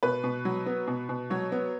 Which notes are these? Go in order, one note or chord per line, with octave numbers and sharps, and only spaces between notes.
B2 B4
B2
F#3
B3
B2
B2
F#3 C#5
B3